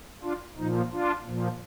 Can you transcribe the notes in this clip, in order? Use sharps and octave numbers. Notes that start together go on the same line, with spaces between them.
D4 F4
A#2 F3 D#4
D4 F4
A#2 F3